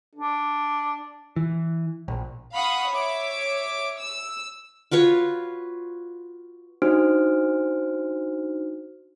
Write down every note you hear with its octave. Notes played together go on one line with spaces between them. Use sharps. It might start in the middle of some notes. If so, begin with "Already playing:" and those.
D4
E3
A#1
F5 F#5 B5 C#6 D#6
C#5 E5 D6
E6
F4 F#4 B4 C#5
D4 D#4 F#4 C5 F6 D7